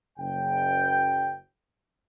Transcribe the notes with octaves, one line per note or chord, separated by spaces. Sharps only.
F#1 C#3 G5